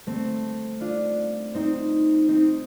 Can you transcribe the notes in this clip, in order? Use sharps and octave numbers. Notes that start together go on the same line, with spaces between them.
A3 C4
D4 F4
C4 D#4
C4 D#4